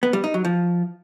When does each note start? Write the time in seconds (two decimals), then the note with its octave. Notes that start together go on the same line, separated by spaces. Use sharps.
0.03 B3
0.13 G3
0.24 D#4
0.34 F#3
0.45 F3